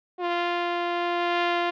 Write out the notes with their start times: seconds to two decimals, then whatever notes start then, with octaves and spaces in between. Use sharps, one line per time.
0.20 F4